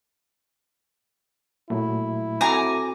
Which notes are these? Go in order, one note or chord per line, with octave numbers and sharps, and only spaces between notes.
A#2 F#3 A3 E4
C4 F#4 A4 G#5 A#5 D6